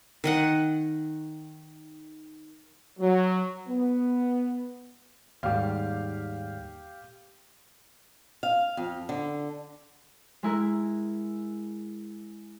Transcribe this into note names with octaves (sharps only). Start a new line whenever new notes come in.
D#3 D#5 F#5
F#3
B3
D#2 G#2 G3 G4 F5
F5
F2
D3
G#3 E4 A#4